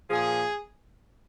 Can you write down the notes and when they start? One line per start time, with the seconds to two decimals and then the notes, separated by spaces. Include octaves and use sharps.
0.10 A#2 F3 G#4